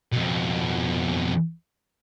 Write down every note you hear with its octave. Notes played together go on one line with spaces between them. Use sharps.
F2 B2